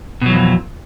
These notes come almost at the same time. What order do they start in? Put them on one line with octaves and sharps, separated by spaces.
B2 F#3 E3 F2